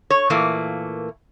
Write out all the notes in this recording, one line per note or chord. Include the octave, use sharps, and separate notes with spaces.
C#5
A#2 E3 A3 A#3